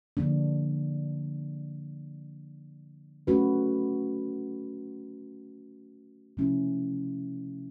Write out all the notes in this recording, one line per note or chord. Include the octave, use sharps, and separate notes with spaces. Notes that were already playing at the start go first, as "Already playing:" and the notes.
D3 F3 A#3 D4
A3 C#4 F#4 B4
C3 F3 A3 C#4 E4